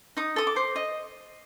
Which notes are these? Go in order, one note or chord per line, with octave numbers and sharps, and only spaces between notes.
D#4 D#6
A4 D#6
D6
C5
D#5